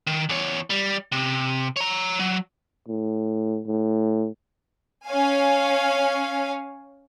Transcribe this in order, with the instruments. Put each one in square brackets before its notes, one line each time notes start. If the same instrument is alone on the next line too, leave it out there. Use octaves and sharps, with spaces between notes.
[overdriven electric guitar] D#3
E2 C#5
G3
C3
C#5 A#5
F#3
[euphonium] A2
A2
[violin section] C#4 C#5 F5 G#5